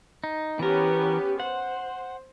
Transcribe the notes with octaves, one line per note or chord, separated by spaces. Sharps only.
D#4
E3 B3 C#4 G4 A#4
C5 F#5